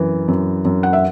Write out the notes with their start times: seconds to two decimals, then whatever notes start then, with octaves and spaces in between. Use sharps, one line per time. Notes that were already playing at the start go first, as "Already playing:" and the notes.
Already playing: F#2 E3
0.28 F#2
0.65 F#2
0.83 F#5
0.93 E5